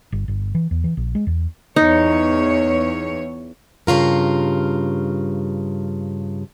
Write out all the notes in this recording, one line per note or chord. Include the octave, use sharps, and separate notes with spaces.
G1
G1
E3
E2
E3
A#1
G#3
E2
E2 D#4 C#5
G2 C#3 F4 A#4